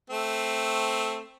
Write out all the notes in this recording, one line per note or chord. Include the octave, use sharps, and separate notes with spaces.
A3 C4